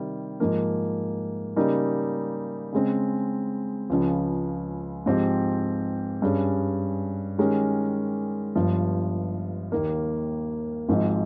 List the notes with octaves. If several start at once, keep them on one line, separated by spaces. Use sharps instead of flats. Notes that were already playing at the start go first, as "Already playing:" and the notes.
Already playing: C3 D#3 G3
G#2 F3 A#3
C#3 G3 A#3 D#4
C#3 G#3 C4
C#2 C#3 F3
G#2 F3 C4 G4
G2 G3 C#4 G#4
D#3 G#3 C#4 G4 A#4
G1 G2 F3
D#2 D#3 A#3
G#1 G#2 F3